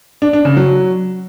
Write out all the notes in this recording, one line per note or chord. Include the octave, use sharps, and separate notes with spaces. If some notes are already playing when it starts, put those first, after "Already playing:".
D4
D4
C#3
F#3